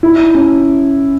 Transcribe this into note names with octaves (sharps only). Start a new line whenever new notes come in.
E4
C#4